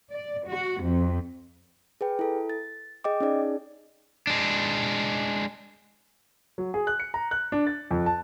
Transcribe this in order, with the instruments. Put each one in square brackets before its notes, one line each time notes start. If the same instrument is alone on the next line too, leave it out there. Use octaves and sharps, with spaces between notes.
[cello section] D5
F#4
F2
[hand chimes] G#4 B4 G5
E4 A4
A6
G#4 D#5 G5 D6
C#4 D#4 G#4 D5
[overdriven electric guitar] G#3 D4
[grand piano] F#3
G#4
F#6
C#7
A#5
F#6
D4
A6
F2
A5